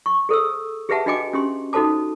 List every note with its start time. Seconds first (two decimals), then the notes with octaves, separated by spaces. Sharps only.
0.06 C#6
0.29 G#4 A4 C5 E6
0.89 G4 G#4 B4 E5 F#5 A5
1.06 D4 F#4 D#5 G5 G#5 D6
1.33 C#4 G4 C6
1.73 D#4 F#4 A4 C5 A5 D6